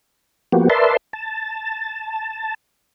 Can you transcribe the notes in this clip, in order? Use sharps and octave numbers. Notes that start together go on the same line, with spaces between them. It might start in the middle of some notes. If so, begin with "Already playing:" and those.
F3 A#3 B3 F#4 G4
A#4 B4 D5 E5 A5 C6
A5